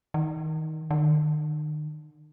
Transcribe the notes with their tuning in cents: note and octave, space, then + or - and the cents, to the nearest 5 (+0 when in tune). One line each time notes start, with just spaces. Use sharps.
D#3 +15
D#3 -40